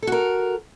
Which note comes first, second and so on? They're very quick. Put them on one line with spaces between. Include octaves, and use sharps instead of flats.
A4 F#4 A#4